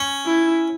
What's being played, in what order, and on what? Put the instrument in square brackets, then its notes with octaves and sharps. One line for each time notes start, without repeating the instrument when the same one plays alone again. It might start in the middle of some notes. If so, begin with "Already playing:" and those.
Already playing: [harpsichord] C#4
[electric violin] E4